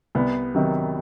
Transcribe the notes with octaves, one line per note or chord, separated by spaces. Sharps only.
C2 B3
C3 D#3 F#3